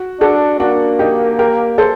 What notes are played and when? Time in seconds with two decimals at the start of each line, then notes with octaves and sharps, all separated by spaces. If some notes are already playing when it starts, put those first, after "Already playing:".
Already playing: F#4
0.21 D4 F#4 A4
0.60 A#3 D4 F#4
0.99 D#4 G4
1.39 G4 A#4
1.78 A4 C5